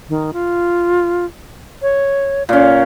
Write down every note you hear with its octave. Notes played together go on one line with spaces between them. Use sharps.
D#3
F4
C#5
A#2 C#4 F5